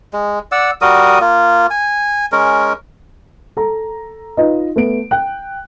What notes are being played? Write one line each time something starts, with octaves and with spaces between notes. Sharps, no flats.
G#3
D5 F#5 E6
G3 F#4 A#4 D#6
A#3 F4
G#5
G#3 C#4 A#4
A4 A#5
D#4 F4 B4 D#5
A3 B3 D7
G5 F#6